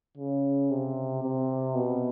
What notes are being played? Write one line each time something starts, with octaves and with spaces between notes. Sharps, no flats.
C#3
C3
C3
B2